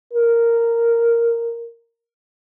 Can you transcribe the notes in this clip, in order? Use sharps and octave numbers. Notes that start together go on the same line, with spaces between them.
A#4